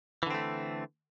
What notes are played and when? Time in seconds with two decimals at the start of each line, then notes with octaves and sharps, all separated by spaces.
0.23 E3
0.27 D3
0.30 C4
0.34 A3